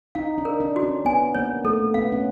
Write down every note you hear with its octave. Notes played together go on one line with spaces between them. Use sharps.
D#4 F5
D4
A#4
D4
F#4
C#4
B3 G#5
A#3 C#5
A3 A4
B3 F5
C#4